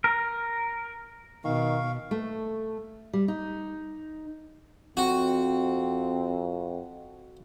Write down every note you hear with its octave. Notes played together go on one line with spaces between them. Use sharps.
A#4
B2 D#3 F5 C#6
A3
G3
D#4
F2 C4 F#4